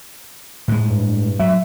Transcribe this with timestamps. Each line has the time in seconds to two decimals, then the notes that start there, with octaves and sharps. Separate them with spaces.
0.68 A2 G#3
0.89 G2
1.40 F#3 E5